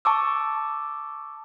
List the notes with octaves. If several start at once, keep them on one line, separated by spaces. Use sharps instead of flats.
A5 C#6 D6 E6